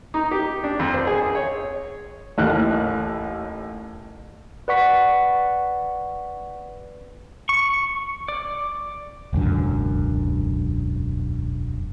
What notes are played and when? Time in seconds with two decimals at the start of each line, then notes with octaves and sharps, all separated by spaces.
0.14 D#4
0.31 G4
0.63 D4
0.79 F2
0.94 C5
1.07 G#4
1.22 G#4
1.35 C#5
2.38 A1 D#2 F#6
4.68 B4 D5 F#5 C#6 B6
7.49 C#6
8.28 D5
9.33 E1 C#2 F#2 D3